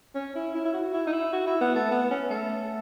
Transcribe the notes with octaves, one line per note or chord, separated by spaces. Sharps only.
C#4
E4
E4
E4
F#4
E4
D#4
E4
F#4
E4
B3
A3
B3
C#4
A3